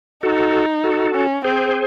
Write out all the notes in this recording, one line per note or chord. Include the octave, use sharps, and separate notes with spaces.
D#4 F#4 A4
F#4 A4
C#4
C4 G#4 C5